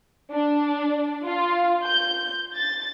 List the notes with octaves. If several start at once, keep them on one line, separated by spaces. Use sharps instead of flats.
D4
F4
G6
A6